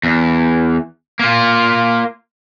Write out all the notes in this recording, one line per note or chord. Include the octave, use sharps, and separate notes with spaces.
E2
A#3 F4